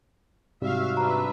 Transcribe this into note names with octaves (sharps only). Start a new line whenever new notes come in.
G#2 C3 G3 F#4 E5 F5
D4 B4 E5 A#5